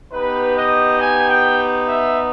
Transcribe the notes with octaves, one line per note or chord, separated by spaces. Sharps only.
B3 D#4 G4 B4
D#5
G#5
G5
E5